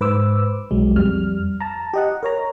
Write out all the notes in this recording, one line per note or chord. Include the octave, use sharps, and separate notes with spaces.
G#2 B4 C5 D6 E6
B1 F#3 G#3
F2 G3 F6
A5 A#5
G4 D#5 F#5
A#4 C#5 A#5